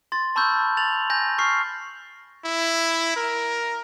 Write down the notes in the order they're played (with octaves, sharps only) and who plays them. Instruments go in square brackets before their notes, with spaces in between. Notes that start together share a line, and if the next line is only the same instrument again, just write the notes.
[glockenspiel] C6 A6
A5 B5 C#6 E6 F6 G6
A6 F7 F#7
G#5 G6 A#6 F7
C#6 F6 C7
[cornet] E4
A#4